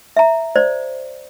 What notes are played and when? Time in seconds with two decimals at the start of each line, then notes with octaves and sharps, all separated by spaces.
0.17 E5 A#5
0.56 C5 D5